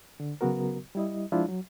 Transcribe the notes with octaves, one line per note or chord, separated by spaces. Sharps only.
D3
C#3 F#3 B3 F#4 A#4
G3 E4 D#5
F3 G#3 D4 E4 F4
F#3